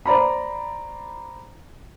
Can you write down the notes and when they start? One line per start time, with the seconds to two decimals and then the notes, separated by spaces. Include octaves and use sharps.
0.06 C5 D5 A#5 B5